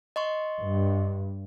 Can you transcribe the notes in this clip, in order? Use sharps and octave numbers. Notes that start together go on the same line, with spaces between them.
D#5 C6 C#6
G2